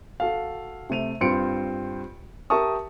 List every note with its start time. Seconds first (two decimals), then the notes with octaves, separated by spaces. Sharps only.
0.20 F#4 A4 F5
0.89 C3 A3 D#7 F7
1.21 G2 C4 F4 C#7 D7
2.50 G4 A#4 E5 A5 C#6 D#6